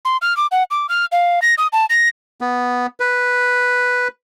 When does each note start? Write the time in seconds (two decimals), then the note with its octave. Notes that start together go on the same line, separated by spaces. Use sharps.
0.05 C6
0.22 F6
0.37 D6
0.51 F#5
0.71 D6
0.89 F6
1.12 F5
1.42 A#6
1.58 D#6
1.73 A5
1.90 A#6
2.41 B3
3.00 B4